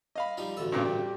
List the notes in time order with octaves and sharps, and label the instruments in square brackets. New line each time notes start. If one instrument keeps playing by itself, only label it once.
[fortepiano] D#5 F5 B5
[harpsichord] F3 G3 D#4
A1 D2 A4
[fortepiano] G2 A#2 C#3
G3